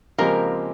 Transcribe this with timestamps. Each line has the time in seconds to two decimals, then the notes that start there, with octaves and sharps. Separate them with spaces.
0.18 C#3 F3 G#3 A#3 C4 G4 A#4